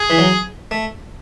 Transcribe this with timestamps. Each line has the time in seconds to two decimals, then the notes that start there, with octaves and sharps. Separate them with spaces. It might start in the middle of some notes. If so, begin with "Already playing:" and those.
Already playing: G#4
0.10 E3
0.18 F#3
0.71 A3